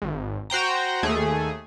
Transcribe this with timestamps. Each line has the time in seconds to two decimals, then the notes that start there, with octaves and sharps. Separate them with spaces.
0.02 G#1
0.50 F#4 C5 G5 A#5
1.03 D#2 A3 G#4